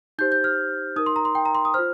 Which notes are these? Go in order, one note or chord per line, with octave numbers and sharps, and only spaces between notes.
D#4 G4 C5 G6
G6
F6
D#4 A#4 D#6
C6
A#5
C6
G5
A#5
C6
D#6
F4 C5 F6